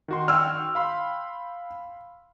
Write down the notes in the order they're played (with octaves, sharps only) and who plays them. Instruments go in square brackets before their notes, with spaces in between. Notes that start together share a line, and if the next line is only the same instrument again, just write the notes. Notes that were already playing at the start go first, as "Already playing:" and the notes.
[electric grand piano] D#3 F#4 C6
[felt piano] G5 E6 F6
[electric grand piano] F5 B5 C6